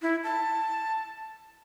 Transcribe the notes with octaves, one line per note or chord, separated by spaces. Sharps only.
E4
A5